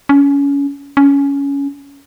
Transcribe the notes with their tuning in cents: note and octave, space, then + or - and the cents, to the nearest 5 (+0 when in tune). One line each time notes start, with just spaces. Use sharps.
C#4 +25
C#4 +15